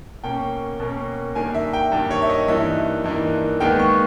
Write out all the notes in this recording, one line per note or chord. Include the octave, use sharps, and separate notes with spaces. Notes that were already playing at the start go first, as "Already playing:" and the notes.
B2 A#3 C#4 G5
B2 A#3 C#4
G2 D#3 A#3 G#5
E5
G5
G2 D#3 A#3
C#5
E5
D#5
G2 E3 A#3 D#4 E5
G2 E3 A#3 D#4
D#2 D#3 G#3 B3 G5
C#6